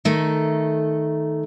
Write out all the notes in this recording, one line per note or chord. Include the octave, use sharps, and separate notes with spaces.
D#3 A3 A4